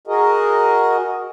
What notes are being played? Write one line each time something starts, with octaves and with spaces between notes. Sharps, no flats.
F#4 G#4 A#4 D#5